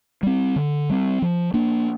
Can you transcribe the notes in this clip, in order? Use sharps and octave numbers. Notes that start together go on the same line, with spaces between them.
G3 C4
D3
G3 C4
F3
A#3 D4